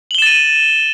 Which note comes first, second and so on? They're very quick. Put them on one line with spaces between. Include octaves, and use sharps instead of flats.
F#7 G7 E7 A6 D#7